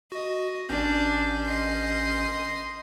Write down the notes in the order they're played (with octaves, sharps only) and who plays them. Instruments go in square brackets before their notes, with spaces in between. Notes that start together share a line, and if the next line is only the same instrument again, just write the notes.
[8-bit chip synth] F#4 [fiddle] D#5
[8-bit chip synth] A1 C#4 G6 [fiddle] D4
[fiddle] D#5 C6